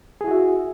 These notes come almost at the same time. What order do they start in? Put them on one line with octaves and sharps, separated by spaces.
G#4 E4 F#4 E5